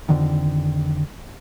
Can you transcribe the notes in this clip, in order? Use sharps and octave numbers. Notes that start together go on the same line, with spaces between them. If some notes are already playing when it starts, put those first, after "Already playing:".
F2 D3 D#3